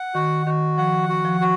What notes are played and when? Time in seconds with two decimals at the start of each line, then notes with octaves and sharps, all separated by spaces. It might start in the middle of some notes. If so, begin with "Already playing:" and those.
Already playing: F#5
0.15 D#3 F#4
0.46 D#3 F#4
0.78 F3 F#5
1.09 F#4
1.25 F3
1.41 F#4